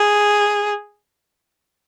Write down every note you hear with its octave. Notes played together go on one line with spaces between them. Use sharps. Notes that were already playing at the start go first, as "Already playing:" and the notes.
Already playing: G#4